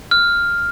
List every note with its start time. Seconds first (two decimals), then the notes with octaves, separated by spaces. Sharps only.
0.11 F6